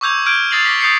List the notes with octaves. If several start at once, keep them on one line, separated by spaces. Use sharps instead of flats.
C#6 D6 E6 G6 G#6 F7
F6 G6 G#6 D7 D#7
D#6 A6 A#6 C7 F7 F#7
D6 A#6 B6 F7
D#6 G6 A6 C7 C#7